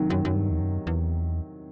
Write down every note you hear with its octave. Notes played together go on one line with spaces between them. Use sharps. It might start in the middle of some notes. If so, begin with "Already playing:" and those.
Already playing: C3 D#3 F#3
F#2 D#3
F#2
G2
E2
F#2
E2